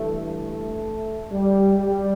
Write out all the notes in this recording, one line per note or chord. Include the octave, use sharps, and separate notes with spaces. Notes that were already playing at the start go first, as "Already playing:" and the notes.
Already playing: G2 E3 A3
A3
G3
G3